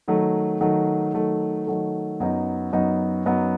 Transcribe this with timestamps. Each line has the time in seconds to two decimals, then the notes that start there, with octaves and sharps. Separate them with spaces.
0.08 D#3 F#3 A3
0.61 D#3 F#3 A3
1.14 D#3 F#3 A3
1.67 D#3 F#3 A3
2.20 F#2 F#3 B3 D#4
2.73 F#2 F#3 B3 D#4
3.26 F#2 F#3 B3 D#4